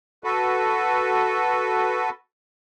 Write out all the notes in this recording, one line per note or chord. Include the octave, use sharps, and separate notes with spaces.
F#4 A4 B4